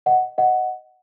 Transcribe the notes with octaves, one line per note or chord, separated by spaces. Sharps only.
D#5 F#5
D#5 F#5